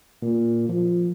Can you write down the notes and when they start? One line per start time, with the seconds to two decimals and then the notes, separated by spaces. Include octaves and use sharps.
0.22 A#2
0.69 F3